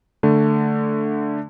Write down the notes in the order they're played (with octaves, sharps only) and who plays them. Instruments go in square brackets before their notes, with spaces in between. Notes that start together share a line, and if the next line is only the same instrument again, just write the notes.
[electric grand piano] D3 A3